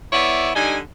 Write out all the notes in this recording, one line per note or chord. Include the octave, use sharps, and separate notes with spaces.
B3 E4 C#5 D5 E5
D3 G3 D#4 G#5